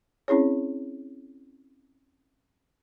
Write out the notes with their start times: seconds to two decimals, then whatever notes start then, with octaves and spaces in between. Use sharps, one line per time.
0.28 C4 C#4 E4 G#4 C#5